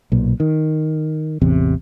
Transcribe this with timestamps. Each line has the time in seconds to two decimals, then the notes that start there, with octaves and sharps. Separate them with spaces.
0.12 B1 A#2
0.40 D#3
1.41 A1 E2 C3